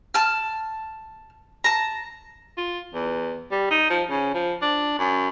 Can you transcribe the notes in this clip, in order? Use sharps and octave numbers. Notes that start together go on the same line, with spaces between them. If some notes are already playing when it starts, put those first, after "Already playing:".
A5 F6
A5 A#5
F4
E2
G3
D#4
F3
C#3
F3
D4
F#2